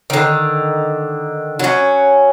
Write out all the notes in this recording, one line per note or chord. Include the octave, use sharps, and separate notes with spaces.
D3 D#3
F#3 C#4